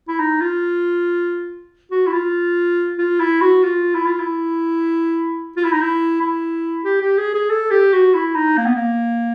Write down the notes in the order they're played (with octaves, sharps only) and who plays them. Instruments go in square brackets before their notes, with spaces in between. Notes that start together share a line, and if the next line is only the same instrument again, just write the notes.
[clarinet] E4
D#4
F4
F#4
E4
F4
F4
E4
F#4
F4
E4
F4
E4
F4
E4
D#4
E4
E4
G4
G4
G#4
G#4
A4
G4
F#4
E4
D#4
A#3
B3
A#3